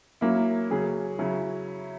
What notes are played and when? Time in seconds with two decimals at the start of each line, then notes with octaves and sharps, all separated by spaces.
0.21 F#3 A#3 C#4 E4
0.70 C#3 F#3 C#4 G#4
1.19 C#3 F#3 C#4 E4